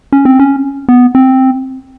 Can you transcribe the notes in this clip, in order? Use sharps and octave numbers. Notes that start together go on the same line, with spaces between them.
C#4
C4
C#4
B3
C4